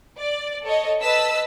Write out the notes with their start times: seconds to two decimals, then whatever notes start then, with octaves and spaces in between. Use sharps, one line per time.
0.18 D5
0.63 A4 C#5 D#5
1.01 B4 D#5 A5 E6 B6